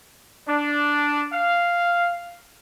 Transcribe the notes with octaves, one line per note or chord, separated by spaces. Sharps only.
D4
F5